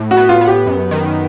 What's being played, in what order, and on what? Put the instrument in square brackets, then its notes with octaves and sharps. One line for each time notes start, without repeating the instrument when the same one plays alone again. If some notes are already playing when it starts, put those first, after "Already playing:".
Already playing: [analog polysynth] A2
[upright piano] F#4
[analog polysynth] B3
[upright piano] F4
[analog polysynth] B3
[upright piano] G4
[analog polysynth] F#2
D#3